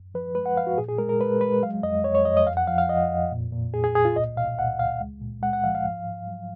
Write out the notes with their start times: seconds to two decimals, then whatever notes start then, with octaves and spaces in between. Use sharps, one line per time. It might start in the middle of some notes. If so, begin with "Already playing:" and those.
Already playing: F#2
0.14 F3 B4
0.35 G#3 B4
0.46 F#5
0.57 F3 F5
0.67 F#4
0.78 A#2 G#4
0.89 G#4
0.98 G#3 A#4
1.09 A#4
1.20 G#3 B4
1.41 G#3 B4
1.63 F#3 F5
1.83 F2 D#5
2.04 F2 C#5
2.15 C#5
2.25 F2 D#5
2.37 D#5
2.46 F2 F5
2.57 F#5
2.67 F3 F5
2.78 F5
2.89 F3 D#5
3.10 F2
3.32 A#2
3.53 A#2
3.73 A#2 G#4
3.84 G#4
3.95 A#2 G#4
4.05 F4
4.16 C#2 D#5
4.37 B2 F5
4.59 C#2 F#5
4.79 C#2 F5
5.00 G#3
5.21 A#2
5.42 G#3 F#5
5.53 F#5
5.64 F3 F5
5.75 F5
5.85 G#2
6.07 G#2
6.27 F#3